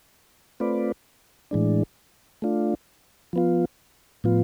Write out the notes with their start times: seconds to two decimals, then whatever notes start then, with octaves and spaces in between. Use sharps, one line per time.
0.60 A3 C4 F4 B4 D5
1.51 A2 E3 G#3 D4
2.42 A3 D4 F4
3.33 F3 B3 F4
4.24 A2 F3 B3 F4